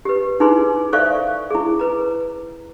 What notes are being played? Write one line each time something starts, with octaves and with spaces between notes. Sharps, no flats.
G4 B4
D#4 E4 G#4 B4 C6
A4 C5 D5 E5 F5 C#6
E4 G#4
B4 A#5